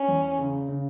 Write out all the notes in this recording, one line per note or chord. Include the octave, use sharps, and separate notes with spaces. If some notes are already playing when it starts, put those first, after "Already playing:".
Already playing: C#4
E2
C#3
C#3